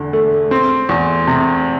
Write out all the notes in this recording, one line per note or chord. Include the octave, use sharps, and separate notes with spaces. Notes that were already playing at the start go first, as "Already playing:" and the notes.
Already playing: E2 D3
A3
C4
E2
C3